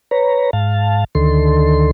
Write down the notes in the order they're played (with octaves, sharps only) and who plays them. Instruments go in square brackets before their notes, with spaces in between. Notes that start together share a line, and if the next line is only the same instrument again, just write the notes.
[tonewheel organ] B4 C#5 A#5
G#2 F5 A5
D2 D3 D#3 A4 C6